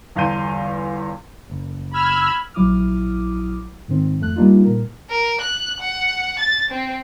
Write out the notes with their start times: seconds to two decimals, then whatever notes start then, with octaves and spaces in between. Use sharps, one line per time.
0.16 G1 E2 F5 C6 G6 D#7
1.50 F#1
1.93 B5 E6 F6 G#6
2.54 A#1 F#3 E4 D6 D#6 F6
3.88 G#2 D#3 C4
4.20 F2 A3 F#6
4.36 G3 A#3 D4 D#4 F4
4.65 A#2 A#4
5.10 A#4
5.41 F#6
5.80 F#5
6.39 A6
6.70 C4